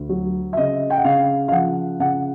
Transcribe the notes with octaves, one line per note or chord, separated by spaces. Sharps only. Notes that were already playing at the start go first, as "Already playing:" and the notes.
Already playing: D2
F#3
E5
C#3 D#5
G5
F#5
C#3 F5
F5
F3 F#5
C#3 F#5